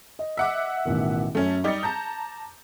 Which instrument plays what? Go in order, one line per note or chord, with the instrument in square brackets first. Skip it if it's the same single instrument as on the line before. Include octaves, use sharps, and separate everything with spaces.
[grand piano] D#5
[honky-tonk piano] E5 F#5 D6
[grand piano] A1 B2 D#3
[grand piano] F#2 [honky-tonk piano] A3 C#4
[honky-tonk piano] G3 D#4 [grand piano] D6 A6 C#7
[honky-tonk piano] A5 A#5 G6